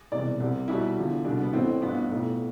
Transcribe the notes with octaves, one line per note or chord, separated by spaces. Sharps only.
E1 E2 C3 G3 D5
C2 C3 G3
B1 B2 G3 E4
E2 D3 F3
C2 B2 G3 D4
B3
A1 A2 E3 C4
A1 G2 F3 B3
B1 A2 F3